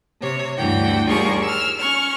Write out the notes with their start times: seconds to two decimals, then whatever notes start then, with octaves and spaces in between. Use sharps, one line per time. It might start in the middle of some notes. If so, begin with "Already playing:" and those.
0.20 C3 C#5
0.56 D2 G2 E3 F#5 G5
1.07 D#2 G3 F4 G#4 A#4 C#6
1.44 E6 F6
1.78 C#4 C#6 F6